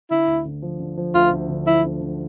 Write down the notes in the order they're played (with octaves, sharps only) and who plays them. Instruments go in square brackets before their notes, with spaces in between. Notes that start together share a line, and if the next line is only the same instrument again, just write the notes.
[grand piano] D3 [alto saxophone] E4
[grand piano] D2
D3
F3
D3
F3
[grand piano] D2 [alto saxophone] F4
[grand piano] D2
D3
[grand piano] F3 [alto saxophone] E4
[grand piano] D2
D3